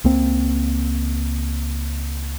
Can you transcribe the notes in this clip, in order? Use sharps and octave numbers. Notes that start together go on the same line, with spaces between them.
C#2 A#3 C4